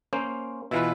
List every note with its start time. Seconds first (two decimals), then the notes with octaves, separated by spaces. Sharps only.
0.13 A#3 C#4 C5
0.71 B2 E3 E4 F4 B4